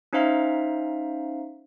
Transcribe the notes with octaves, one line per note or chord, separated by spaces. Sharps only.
C#4 D#4 C5 E5 F5 A#5